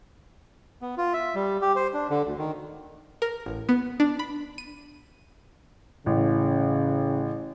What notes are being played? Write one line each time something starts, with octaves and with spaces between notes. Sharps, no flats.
B3
F4
E5
G3
G4
C5
D4
D3
D2
D#3
A#4
A1
B3
D4
B5
D#7
A1 C#3